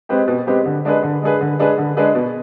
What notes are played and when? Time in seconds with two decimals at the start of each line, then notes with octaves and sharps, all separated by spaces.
0.09 G#3 C4 G4 B4
0.28 B2
0.47 G#3 C4 G4 B4
0.65 D3
0.85 G#3 D4 G#4 B4
1.03 D3
1.22 G#3 D4 G#4 B4
1.41 D3
1.60 G#3 D4 G#4 B4
1.78 D3
1.97 G#3 D4 G#4 B4
2.15 B2